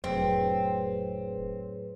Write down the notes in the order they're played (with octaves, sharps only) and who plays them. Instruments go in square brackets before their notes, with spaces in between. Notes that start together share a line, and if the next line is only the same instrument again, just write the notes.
[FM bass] F1 [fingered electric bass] A2 F#3 [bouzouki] C4 [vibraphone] G#4 B4 C#5